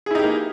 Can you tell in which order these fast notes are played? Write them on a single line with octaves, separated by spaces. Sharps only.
G#4 E4 D#4 G4 A#3